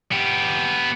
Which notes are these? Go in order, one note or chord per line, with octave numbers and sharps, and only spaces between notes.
B3 G4